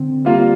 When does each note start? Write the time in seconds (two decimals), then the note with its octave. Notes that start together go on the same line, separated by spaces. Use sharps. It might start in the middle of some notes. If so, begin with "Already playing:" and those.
Already playing: D3 C4
0.25 G3 A#3 F4